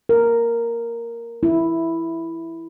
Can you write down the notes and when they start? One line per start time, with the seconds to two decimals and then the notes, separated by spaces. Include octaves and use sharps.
0.09 A#4
1.43 E4